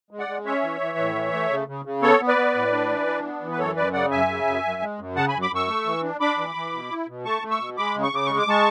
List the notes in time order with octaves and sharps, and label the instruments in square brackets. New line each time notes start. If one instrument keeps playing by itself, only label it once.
[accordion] G#3
D5 F#5
G#3
C#4 C#5 E5
E3
E3
A2
E3
A3
C#3
C#3
C#3
B3 A4 C#5
B3
B4 D5
B3
A2
D4
E3
D4
B3
E3
B4
F#2 A4 C#5
F#2 B4 D5
C#3 D5 F#5
F#2 E5 G#5
C#3
F#2
F#2
G#3
F#2
C#3 F#5 A5
G#5 B5
F#2
B5 D6
F#2 C#6 E6
A3
E3
D4
D4 B5 D6
E3
E3
B2
E4
B2
A3 A5 C#6
A3
C#6 E6
B2
G#3 B5 D6
C#3
C#6
C#3 D6
G#3 C#6
D6
G#3 A5 C#6